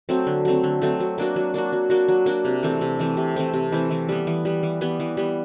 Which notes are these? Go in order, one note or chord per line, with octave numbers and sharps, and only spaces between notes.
F#3 A3 C4
D3
F#3 A3 C4
D3
F#3 A3 C4
F#3
A#3 D4 F#4
F#3
A#3 D4 F#4
F#3
A#3 D4 F#4
F#3
A#3 D4 F#4
C3
E3 A3 C4
C3
E3 A3 C4
C3
E3 A3 C4
C3
E3 A3 C4
E3
G3 B3
E3
G3 B3
E3
G3 B3
E3
G3 B3